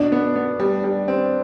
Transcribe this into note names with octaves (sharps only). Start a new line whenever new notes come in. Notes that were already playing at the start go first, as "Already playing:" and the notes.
Already playing: B2 D4
B3
B3
G3
G3
C4